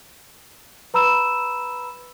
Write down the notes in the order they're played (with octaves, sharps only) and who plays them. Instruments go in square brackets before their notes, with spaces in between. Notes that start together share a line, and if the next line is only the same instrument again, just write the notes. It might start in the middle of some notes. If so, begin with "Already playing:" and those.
[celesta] B4 A#5 B5 E6 E7